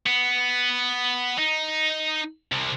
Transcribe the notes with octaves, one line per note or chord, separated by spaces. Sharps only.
B3
D#4
C2 C3